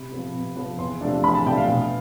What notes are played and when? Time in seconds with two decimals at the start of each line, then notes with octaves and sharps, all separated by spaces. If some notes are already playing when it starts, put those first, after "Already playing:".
Already playing: C3 B5
0.12 F3 B3
0.33 C3
0.56 F3 B3
0.78 E2 C6
1.01 C3 F3 A3 D4
1.24 E2 B5
1.35 A5
1.46 C3 F3 A3 D4 G5
1.52 E5
1.57 F5
1.69 B2